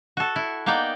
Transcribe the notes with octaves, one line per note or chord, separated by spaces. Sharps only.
F#4 A4
E4
A#3 B3 D#4 D5 G5